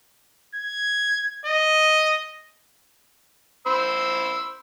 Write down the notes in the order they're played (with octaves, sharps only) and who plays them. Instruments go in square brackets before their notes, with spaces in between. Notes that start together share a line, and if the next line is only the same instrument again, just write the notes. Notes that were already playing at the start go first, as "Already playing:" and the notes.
[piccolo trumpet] G#6
D#5
[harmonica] C5 B5 E6